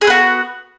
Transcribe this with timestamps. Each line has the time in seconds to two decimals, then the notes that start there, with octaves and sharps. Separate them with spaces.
0.01 G#4
0.04 A3
0.07 B3
0.10 F#4